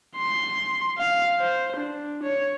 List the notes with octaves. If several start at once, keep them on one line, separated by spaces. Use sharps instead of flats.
C6
F5
C5
D4
C#5